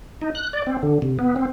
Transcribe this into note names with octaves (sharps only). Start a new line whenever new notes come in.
D#4
F#6
D5
C4
D3
C3
B3
C4